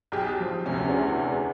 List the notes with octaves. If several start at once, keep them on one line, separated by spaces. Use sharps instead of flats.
B1 G4 G#4
F3
D2 C3 C#4
E2